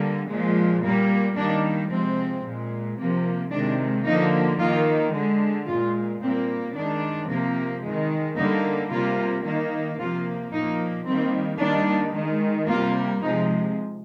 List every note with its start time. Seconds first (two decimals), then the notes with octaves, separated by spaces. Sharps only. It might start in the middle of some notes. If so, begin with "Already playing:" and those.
Already playing: D3 G3 A#3
0.28 A#2 F3 G#3
0.82 A#2 G3 A#3
1.36 D#3 G3 A#3 D4
1.90 C3 F3 G#3 C4
2.44 A#2 G#3
2.98 C3 F3 A#3
3.51 C3 D#3 G#3 D4
4.05 D3 F3 A#3 D#4
4.59 D#3 A#3 F4
5.13 D3 G#3
5.67 A#2 G#3 F4
6.21 A#2 G3 A#3 C4
6.75 D#3 G#3 D4
7.29 C3 F3 A#3
7.82 D#3 G#3
8.36 D3 G3 A#3 D#4
8.90 C3 G3 A#3 F4
9.44 D#3 A#3
9.98 C3 F3 A#3 F4
10.52 A#2 F3 A#3 D#4
11.06 D#3 G3 A#3 C4
11.59 D#3 G3 A#3 D4
12.14 D#3 G#3
12.67 C3 G3 A#3 F4
13.21 C3 F3 G#3 D#4